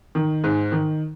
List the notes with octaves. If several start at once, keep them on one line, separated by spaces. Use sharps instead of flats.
D#3
G#2
D#3